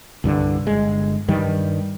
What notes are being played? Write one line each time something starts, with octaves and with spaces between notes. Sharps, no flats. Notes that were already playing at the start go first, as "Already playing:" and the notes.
C2 G2 D3
G1 G#3
G2 D#3 G3